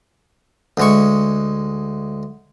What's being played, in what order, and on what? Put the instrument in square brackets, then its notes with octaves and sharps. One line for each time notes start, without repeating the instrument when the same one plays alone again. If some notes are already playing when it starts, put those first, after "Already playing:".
[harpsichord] D2 G#3 C#6